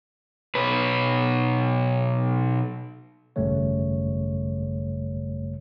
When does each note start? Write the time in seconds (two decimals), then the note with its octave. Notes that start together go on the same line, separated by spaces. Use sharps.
0.55 B1 B4
3.36 G#1 F#2 C#3 G3 A3 C#5